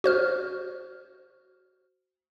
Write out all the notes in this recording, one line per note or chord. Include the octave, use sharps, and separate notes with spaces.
F#4 C5 F6